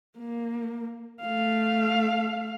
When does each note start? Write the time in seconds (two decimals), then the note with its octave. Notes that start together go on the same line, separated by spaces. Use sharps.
0.18 A#3
1.22 A3 F5